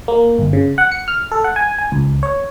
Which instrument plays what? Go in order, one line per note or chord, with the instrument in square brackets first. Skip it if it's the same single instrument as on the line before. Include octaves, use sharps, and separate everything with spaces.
[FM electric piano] A#3
G1
C#3
F#5
C#7
F6
A4
F#5
G#5
G#5
C#2
C#5